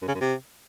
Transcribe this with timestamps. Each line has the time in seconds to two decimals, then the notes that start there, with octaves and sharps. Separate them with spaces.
0.02 F#2
0.08 C#3
0.15 F#2
0.21 C3